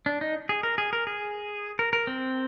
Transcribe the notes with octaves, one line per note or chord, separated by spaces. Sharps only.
D4
D#4
G#4
A#4
G#4
A#4
G#4
A#4
A#4
C4